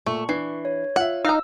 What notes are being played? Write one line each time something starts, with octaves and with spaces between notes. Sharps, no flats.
A#2 A3 C#6
E3 D4 C7
C#5
F4 E5 F#5
D#4 F5 A#5 E6